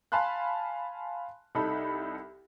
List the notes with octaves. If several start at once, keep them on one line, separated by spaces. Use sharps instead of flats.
F5 G#5 A5 B5 C6 F#6
C2 D#4 A4 B5